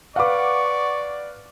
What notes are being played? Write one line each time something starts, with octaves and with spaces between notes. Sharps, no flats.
B4 D5 F5 F#5 C#6 D6